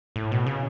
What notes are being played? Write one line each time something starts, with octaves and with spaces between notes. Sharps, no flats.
A2
B2
C#3